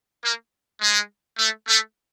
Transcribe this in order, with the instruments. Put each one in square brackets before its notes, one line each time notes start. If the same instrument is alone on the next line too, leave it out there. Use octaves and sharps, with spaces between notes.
[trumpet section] A#3
G#3
A3
A3